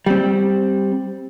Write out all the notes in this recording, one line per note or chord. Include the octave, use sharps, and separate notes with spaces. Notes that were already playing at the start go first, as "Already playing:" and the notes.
G3 C4